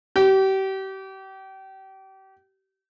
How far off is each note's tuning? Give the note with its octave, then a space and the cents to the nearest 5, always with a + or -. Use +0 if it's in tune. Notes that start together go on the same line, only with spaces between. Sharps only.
G4 -35